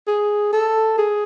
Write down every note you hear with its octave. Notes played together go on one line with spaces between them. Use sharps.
G#4
A4
G#4